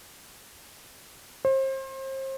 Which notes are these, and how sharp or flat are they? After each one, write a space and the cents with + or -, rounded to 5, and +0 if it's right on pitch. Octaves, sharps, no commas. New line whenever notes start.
C5 +35